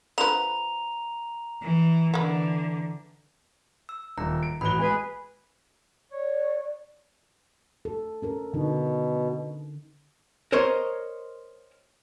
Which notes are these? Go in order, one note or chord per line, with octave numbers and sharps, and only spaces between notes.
D3 F3 B4 A#5 F7
E3
D3 E3 A#3 B3
E6
D#1 A#5
D7
A1 F#4 B5 F#6 G7
G#3 G#4 B4 G#5
C#5 D5
A4
C#4 A4 A#4
B2 D3 D#4
A#4 C5 C#5 D#5